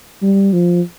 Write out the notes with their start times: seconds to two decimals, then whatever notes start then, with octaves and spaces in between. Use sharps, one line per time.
0.23 G3
0.53 F3